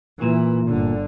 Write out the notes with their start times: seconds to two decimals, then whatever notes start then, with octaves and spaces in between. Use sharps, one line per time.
0.22 A#2 E3
0.70 G1 D3